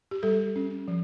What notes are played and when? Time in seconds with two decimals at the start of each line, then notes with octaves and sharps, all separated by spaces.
0.11 G4
0.23 G3 A4
0.56 C#4
0.88 F3